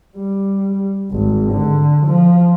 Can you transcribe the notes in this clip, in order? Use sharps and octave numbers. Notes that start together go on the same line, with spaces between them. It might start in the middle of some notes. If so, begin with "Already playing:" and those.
G3
G#1
D3
F3